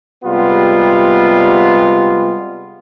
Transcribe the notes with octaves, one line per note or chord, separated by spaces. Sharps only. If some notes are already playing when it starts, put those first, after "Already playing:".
C3 G3 G#3 B3 F4